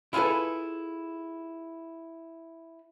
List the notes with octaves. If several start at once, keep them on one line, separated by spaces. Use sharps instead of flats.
E4 F4 G#4 A4 B4